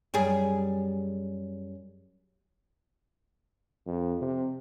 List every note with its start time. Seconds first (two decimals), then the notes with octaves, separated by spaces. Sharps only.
0.14 F#2 G3 G#4
3.87 F2
4.21 C3